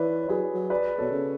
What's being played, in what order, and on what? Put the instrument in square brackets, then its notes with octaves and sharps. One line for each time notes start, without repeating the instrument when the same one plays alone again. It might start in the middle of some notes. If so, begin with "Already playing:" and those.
Already playing: [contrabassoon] E3 [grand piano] B4 C#5 D5 E5
[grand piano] C#5
[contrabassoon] F#3 [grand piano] G#4 B4
[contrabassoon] F#3
[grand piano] B4 D5
[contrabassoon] B2 [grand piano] A4 C#5
[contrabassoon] C#3